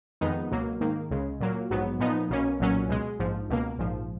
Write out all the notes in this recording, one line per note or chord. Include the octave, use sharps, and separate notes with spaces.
F2 D#3 G#3 B3 D#4
C#2 B2 F#3 A#3
G#2 D#3 A#3
C#2 C#3 G#3
A#2 F#3 A#3
A#1 G#2 F#3 B3
A#2 F3 B3 D#4
B1 B2 A#3 C#4
B1 A#2 F#3 C#4
C#2 B2 G#3
A#1 G#2 F3
C#2 B2 A#3
A#1 G#2 F3